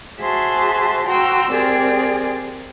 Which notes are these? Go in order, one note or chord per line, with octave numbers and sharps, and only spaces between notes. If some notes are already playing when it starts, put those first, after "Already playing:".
F#4 G#4 C5 E5 A5 C6
F#4 G5 A#5 C6 E6
C4 G4 G#4 A#4 D5